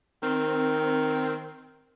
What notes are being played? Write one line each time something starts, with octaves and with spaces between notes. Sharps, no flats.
D#3 C4